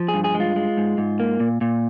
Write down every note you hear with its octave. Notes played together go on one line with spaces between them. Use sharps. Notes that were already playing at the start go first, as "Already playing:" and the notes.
Already playing: F3
G#4
G2
G#4
G#3
F4
G#3
G#2
G#2
A#3
A#2
A#2